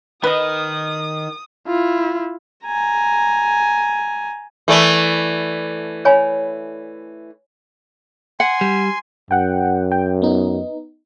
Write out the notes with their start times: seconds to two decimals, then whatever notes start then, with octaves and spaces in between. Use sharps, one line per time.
0.24 D#3 B4 D#5 D#6
1.67 E4 F4
2.65 G#5 A#5
4.68 E3 A3 A#4 D5
6.05 C#5 G#5 B5
8.40 F#5 G#5 C6
8.61 G3
9.31 F#2 F#5 G5
9.92 G5
10.22 B3 D#4